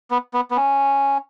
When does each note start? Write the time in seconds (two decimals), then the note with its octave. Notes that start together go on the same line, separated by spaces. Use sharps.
0.11 B3
0.34 B3
0.51 B3
0.56 C#4